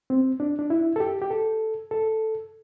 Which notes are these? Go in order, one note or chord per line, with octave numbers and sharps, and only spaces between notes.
C4
D4
D4
E4
A4
G4
G4
A4
A4